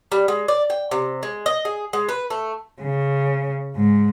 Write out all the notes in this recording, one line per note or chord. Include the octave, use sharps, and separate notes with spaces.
G3
G#3
D5
G5
C3
G#3
D#5
G#4
G#3
B4
A3
C#3
G#2